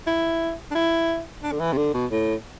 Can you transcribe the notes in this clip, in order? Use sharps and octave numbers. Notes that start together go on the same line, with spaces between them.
E4
D4
E4
D4
D3
E3
C3
D3
B2
A2